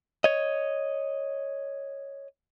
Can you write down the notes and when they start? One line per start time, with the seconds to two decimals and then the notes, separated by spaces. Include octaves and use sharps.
0.24 C#5 D#5